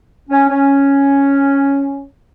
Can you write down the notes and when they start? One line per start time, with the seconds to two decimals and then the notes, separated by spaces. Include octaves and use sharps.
0.30 C#4
0.48 C#4